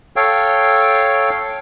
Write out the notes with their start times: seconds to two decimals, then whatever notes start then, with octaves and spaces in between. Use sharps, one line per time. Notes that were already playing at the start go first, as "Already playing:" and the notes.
0.16 A4 C#5 F5 G5